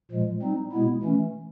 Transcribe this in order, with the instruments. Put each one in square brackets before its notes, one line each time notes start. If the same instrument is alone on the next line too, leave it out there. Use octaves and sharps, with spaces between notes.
[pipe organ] A#2 F3 G#3
G3 C4 D#4
B2 G#3 B3 E4
E3 A3 C#4